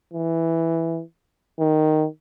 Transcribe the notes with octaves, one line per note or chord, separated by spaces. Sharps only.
E3
D#3